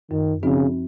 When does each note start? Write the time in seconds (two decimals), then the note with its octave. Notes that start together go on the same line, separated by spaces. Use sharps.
0.11 F#2 D#3
0.43 C#3 F3 C4 D#4 F#4